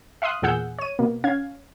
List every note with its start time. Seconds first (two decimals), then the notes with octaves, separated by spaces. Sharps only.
0.22 E5 F5 C6 D#6 F#6
0.42 E2 A#2 G#4 F#5 E6 G6
0.78 C#5 D#7
0.99 B2 A#3
1.24 C#4 F5 G#6